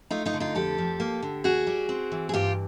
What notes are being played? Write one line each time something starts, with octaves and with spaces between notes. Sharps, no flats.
A3 D#4 F4
D#4 F4
D3
D#4 F4
F2 G4 A4
F3
A#3
D3
D#2 F#4 G#4
G3
C4
E3
G#4
G2 F4 G4